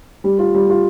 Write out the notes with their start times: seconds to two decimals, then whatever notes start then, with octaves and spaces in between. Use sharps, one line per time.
0.24 G3
0.39 F4
0.55 G3
0.70 F4